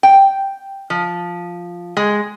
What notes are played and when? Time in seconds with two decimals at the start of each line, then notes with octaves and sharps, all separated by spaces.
0.03 G5
0.90 F3
1.97 G#3